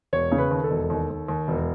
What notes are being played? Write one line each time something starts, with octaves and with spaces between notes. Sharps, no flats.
E1 C#5
C#3
B4
D#2
A4
E1
D#2
D#2
D#2
E1